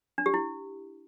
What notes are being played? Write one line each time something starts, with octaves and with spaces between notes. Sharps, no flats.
D4
G4
E4